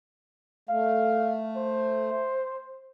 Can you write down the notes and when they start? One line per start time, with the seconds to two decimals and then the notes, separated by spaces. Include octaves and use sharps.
0.69 A3 F5
1.57 C5